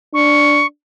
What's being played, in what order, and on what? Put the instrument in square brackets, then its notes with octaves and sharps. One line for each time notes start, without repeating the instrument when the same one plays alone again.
[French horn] D4 [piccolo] C#6